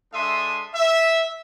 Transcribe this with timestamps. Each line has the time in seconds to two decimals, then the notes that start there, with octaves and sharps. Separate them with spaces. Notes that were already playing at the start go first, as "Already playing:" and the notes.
0.14 G#3 D4 A4 E5 C6 D#6
0.75 E5